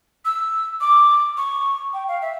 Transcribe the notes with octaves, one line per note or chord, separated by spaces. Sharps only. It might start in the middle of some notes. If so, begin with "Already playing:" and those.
E6
D6
C#6
G5
F5
E5